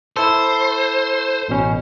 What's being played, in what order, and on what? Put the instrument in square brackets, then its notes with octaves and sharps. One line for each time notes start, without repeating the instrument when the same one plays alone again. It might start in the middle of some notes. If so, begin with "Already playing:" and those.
[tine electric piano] E4 A4 [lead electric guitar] C5
[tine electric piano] A1 B2 C#4